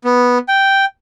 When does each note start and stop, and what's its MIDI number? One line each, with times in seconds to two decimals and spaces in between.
0.04 0.38 59
0.48 0.85 79